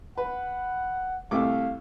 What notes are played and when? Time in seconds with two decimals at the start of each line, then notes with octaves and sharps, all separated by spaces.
0.18 B4 F#5
1.31 C2 A3 F5 D6